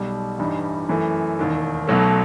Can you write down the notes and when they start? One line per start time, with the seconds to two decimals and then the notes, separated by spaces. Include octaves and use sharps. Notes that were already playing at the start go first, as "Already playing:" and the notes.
Already playing: B1 B2 G3
0.39 A1 G2 E3 G3 D#4
0.89 F#2 E3 A3
1.39 E1 D#2 D#3
1.87 B1 B2 F#3 A3